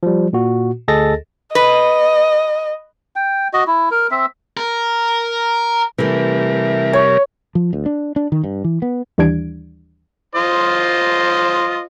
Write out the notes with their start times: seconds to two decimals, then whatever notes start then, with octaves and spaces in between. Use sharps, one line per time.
0.03 F3 G3
0.33 A#2 F#4
0.88 D2 G#4 A4 D#5 A6 A#6
1.55 B4 D#5
3.16 G5
3.53 F#4 D#5
3.67 E4
3.91 A#4
4.11 C4 E5
4.57 A#4
5.98 C3 E3 G3 A3 A#4
6.93 C#5
7.55 F3
7.73 D2
7.86 D4
8.16 D4
8.32 D#3
8.44 G2
8.64 E3
8.82 B3
9.18 D#2 E3 G3 D4 G#6 D7
10.35 F4 C5 D#5